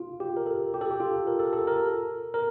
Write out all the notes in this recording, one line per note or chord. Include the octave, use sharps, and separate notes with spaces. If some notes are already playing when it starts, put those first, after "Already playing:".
Already playing: F4
G4
A#4
A4
G4
A4
G4
F4
A#4
A4
A4
A#4
A#4